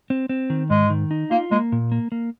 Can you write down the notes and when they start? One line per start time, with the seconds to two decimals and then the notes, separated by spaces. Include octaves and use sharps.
0.10 C4
0.29 C4
0.50 D#3
0.70 G#2 G#3
0.90 D#3
1.11 D#4
1.31 A#3 F4
1.51 G#3 A#3
1.72 A#2
1.92 A#3
2.12 A#3